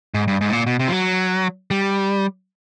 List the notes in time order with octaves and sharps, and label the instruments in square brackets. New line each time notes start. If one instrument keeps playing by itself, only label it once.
[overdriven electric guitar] G#2
G2
G#2
A2
A#2
B2
C3
F3
F#3
G3